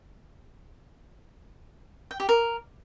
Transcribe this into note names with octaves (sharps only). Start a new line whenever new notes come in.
G5
G4
A#4